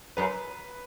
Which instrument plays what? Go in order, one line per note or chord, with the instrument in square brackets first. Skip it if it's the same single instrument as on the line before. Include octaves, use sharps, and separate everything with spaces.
[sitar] F#2 [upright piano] B4